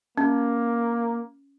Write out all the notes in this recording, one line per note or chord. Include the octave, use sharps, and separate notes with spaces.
A#3 C#4